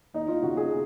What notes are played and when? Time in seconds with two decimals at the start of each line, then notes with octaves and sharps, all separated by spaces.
0.14 D#2 D#4
0.28 F4
0.42 C#3 F#4
0.57 G#4